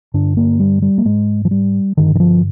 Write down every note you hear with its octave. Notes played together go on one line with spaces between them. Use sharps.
G2 D3 D4
A#3
G3
G3
A#3
G#2 G#3
F3
G3
G2 D3 D#3
D#3
F3